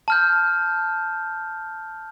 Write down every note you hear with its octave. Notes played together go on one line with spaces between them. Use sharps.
A5 F6 G6